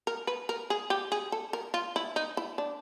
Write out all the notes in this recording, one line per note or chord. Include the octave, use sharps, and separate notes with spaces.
A#4
B4
A#4
G#4
G4
G#4
A4
A#4
F4
E4
D#4
E4
D4